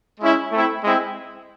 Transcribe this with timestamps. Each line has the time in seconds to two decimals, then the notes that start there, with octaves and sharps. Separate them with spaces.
0.20 G#3 C#4 E4
0.52 A3 C4 E4
0.84 G#3 C4 E4